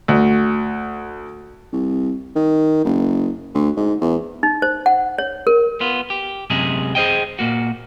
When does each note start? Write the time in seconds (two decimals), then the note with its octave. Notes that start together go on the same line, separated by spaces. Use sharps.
0.08 D2
1.73 C2
2.36 D#3
2.85 F#1
3.54 D2
3.77 G#2
4.01 E2
4.43 D#4
4.62 C5
4.86 F#5
5.18 C#5
5.47 A#4
5.81 B3 F4
6.10 G4
6.50 F#2 C3 G#3 G#4
6.95 G#4 C5 D#5 G5
7.39 A#2 A#3 F#4